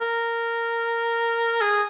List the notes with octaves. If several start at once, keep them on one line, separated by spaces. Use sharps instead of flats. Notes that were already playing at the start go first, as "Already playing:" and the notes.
A#4
G#4